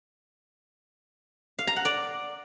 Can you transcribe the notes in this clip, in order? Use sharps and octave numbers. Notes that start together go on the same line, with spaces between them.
F5
A#5
F#5
D5